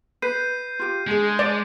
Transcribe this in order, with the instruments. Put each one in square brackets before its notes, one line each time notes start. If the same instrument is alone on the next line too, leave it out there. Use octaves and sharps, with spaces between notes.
[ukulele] B4 [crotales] G6 C7 D#7
[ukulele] F4 G4
[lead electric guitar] G#3 [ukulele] D4 G#4
[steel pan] D5